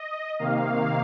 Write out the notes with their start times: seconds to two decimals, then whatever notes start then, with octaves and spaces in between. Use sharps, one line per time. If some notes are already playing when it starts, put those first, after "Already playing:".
Already playing: D#5
0.39 C3 D#3 A#3 F5